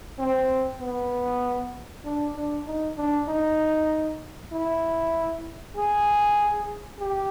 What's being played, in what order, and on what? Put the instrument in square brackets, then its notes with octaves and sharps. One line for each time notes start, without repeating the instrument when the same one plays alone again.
[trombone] C4
B3
D4
D4
D#4
D4
D#4
E4
G#4
G4